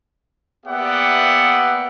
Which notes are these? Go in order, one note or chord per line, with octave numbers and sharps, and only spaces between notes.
A#3 B3 G4 D5 E5 F#5